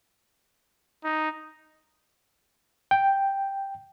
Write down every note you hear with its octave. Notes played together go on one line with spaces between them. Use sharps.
D#4
G5